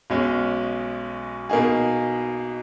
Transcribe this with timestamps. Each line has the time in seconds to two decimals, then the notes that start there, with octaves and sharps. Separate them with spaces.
0.10 B1 B2 G#3 C#4
1.50 B2 A#3 D#4 G#4